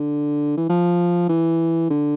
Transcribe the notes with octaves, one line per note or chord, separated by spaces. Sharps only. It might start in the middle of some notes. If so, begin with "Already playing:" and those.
Already playing: D3
E3
F3
E3
D3